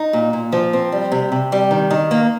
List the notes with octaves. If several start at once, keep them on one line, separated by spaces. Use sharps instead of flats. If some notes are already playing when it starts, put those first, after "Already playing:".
Already playing: D#4
A#2
A#2
F3
C4
G3
C3
C3
G3
D#3
D#3
A#3